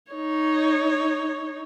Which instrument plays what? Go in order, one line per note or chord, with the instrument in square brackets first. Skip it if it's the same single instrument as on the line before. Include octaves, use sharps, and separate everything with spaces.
[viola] D#4 C#5